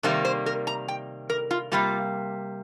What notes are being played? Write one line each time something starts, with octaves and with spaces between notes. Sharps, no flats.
C3 D#3 G3 A#3 C5
C5
A#4
A#5
G5
A#4
F4
C3 G3 A#3 F4